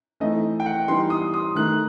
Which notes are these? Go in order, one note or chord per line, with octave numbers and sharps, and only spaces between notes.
E3 A3 C4 D#4 D#5
G5
F#5
E3 G3 B3 D#4 C6
D#6
D#6
D#3 A3 D#4 F#6